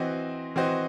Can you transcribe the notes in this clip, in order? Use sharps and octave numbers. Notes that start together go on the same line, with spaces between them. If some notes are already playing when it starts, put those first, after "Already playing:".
Already playing: E3 C4 F#4 C5 D#5
E3 C4 F#4 C5 D#5